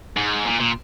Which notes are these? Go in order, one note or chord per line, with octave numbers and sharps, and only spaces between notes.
G#2
A#2
A#2